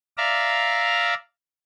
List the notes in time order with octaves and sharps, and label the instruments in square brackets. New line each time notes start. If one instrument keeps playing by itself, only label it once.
[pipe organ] D5 E5 F5 A#5